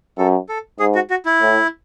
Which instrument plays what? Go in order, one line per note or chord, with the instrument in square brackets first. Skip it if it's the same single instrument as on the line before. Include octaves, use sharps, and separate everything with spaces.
[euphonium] F#2 [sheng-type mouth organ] A4
[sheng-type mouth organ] A4
[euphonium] G#2 [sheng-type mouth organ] G#4
[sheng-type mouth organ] F#4
F#4
E4
[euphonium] A2